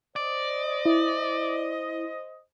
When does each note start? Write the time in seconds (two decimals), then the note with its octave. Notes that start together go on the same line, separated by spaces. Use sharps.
0.16 C5 D5 D#5
0.85 E4